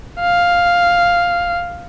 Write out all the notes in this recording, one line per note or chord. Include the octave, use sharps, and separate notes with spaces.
F5